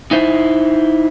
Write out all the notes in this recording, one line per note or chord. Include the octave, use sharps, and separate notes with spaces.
D#4 E4 C5